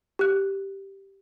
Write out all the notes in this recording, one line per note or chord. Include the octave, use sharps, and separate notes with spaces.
G4 F#6